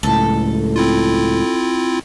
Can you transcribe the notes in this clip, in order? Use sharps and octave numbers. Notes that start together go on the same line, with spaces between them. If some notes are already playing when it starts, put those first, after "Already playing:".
C#2 A2 A4
C4 E4 F4